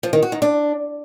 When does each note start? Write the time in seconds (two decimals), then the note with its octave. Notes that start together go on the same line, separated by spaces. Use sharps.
0.03 F3
0.13 D#3
0.22 F#4
0.32 D#3
0.42 D4